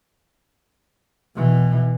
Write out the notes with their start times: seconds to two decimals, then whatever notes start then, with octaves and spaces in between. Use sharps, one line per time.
1.35 B2 E3